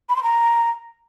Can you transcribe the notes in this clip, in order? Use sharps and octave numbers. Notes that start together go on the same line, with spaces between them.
B5
C6
A#5